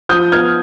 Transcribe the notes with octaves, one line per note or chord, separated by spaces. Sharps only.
F3 D#6 G6
B3 F6 G#6